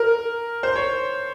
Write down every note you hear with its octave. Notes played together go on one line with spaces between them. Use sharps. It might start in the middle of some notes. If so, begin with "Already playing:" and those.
Already playing: A#4
C5
C#5